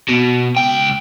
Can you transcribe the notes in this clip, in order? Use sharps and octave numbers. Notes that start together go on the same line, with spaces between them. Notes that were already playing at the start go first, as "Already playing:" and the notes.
B2
C#2 G5